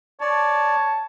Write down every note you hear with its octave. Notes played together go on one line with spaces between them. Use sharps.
C#5 D5 A5